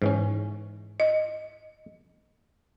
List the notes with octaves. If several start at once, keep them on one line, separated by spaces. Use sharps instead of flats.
G#2 E3 C#4
D#5